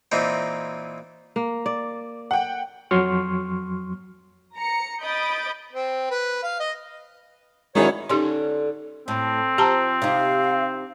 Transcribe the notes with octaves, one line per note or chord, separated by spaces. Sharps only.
A#2 E3 C4 D#4
A#3
D5
F#5 G5
F2 F#3 C6 C#6 F6
A#5 C#7
D#5 B5 D#6 G6 A6 D7
C4
B4
F5
D#5
E2 D#3 F#3 G#3 C#4 E4 C#5
D3 C#4 D#4 G4 C6
A2 C4
F3 G4 A5 A#5
C3 D#4 F5